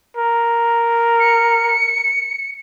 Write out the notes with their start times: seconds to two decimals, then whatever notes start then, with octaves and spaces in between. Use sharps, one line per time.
0.17 A#4
1.20 C#7